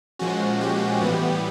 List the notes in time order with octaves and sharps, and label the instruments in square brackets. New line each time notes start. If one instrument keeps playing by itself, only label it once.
[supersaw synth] A#2 F3 G#3 C#4 F#4
G4
A2 E3 G3 B3